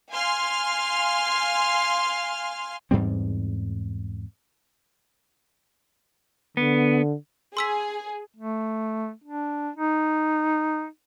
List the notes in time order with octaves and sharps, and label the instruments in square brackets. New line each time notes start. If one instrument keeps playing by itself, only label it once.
[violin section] F5 G#5 C6 F6
[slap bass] E2 G#2 G3 C4
[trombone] D3 [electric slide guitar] B3
[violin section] G#4 [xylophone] C6 E6 B6
[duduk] A3
D4
D#4